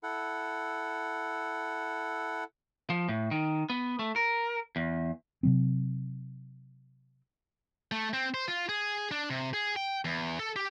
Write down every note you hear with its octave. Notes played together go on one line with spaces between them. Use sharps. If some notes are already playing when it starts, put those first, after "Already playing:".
E4 A4 F#5
F3
A2
D#3
B3
A3
A#4
E2
C3 F#3 C4
A3
C4
C5
F4
G#4
D4
C3
G#4
G5
E2
A4
G4